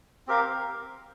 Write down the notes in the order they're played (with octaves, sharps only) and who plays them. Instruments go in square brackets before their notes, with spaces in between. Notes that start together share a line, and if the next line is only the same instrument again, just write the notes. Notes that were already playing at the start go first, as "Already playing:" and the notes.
[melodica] C4 G4 A#4 F5